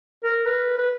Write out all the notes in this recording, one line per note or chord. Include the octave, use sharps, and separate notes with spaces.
A#4
B4
B4